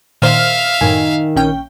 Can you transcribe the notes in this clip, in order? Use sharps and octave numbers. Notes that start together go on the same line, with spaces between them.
A#2 D#3 C5 E5 F5 F6
F#2 A2 D#3 G#5
A#1 C#4 G5